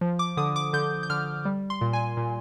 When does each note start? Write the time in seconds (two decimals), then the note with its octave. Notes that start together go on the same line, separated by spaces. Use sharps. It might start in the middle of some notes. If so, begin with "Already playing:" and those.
0.01 F3
0.19 D6
0.37 D3 D#6
0.56 D6
0.73 D3 G6
1.03 G6
1.10 D3 F6
1.45 G3
1.70 C6
1.81 A#2
1.93 G#5
2.17 A#2